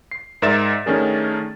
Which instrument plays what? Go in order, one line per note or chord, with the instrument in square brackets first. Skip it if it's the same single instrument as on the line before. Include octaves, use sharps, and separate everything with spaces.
[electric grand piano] C7
G#2 A#4 D5 E5 A6 E7
D#3 A3 C#4 D4 G#4 A#4